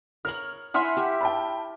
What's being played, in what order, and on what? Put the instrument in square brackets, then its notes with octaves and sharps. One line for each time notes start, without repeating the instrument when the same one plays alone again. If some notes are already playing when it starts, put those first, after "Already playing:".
[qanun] A#4 C#5 A#5 [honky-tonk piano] F6 F#7
[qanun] E4 E5 G#5 [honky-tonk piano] F#5 C6 F6
[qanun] G4 E5
[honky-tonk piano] G5 A5 B5